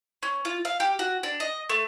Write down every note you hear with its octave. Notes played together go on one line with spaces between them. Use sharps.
C#4
F4
F5
G4
F#4
D4
D#5
A3